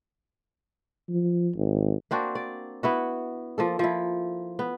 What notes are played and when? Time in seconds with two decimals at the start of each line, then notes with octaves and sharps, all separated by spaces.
1.09 F3
1.56 G#1
2.11 A#3 C4 D4 F#4
2.35 D5
2.83 B3 E4 F#4
3.58 F3 A#3 A4
3.79 F3 E4
4.59 B3